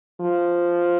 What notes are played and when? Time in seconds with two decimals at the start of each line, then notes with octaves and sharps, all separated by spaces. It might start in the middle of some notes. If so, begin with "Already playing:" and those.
0.20 F3